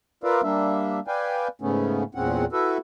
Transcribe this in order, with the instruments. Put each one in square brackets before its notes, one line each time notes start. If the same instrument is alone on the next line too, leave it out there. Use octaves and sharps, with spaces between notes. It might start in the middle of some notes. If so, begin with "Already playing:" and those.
[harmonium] F4 A#4 B4 D5 E5 F5
G3 A#3 D4 E5
B4 D5 F5 G5 G#5
G#2 C#3 A3 B3 C#4
E2 A#2 G#3 C4 C#4 F#5
E4 F#4 A4 B4 E5